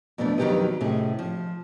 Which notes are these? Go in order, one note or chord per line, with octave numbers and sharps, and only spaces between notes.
F2 B2 E3 A3 D4
F2 D#3 F#3 G4 B4 D#5
A2 C3 C#4 G#4 D#5
F3